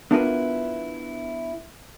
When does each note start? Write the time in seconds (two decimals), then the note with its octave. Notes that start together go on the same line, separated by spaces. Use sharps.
0.11 B3 D4 E4 F4 A#4 B4